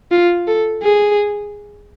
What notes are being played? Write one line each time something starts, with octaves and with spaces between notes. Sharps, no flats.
F4
A4
G#4